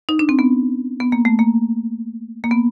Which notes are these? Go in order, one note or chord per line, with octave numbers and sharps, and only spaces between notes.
D#4
D4
C4
B3
B3
A#3
A3
A#3
A#3
B3